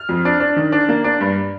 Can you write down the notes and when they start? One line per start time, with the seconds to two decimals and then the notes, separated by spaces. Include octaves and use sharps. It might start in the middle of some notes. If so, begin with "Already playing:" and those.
Already playing: F6
0.09 F2
0.25 D4
0.40 D4
0.57 D#3
0.72 D4
0.89 A#3
1.04 D4
1.20 G2